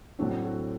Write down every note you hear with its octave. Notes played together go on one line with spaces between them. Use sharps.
A2 F#3 C4 D4 F#4
F#4 A4